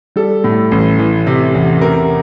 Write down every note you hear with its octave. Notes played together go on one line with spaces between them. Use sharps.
G3 A4
A2
A1
E3
C3
E2
C3 A#4